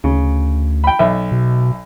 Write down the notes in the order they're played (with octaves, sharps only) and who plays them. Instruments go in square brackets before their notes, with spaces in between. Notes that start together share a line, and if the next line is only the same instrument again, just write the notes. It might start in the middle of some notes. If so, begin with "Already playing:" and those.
[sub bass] D2 [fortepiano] C#3
[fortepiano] G5 B5
B1 E5
[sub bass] B2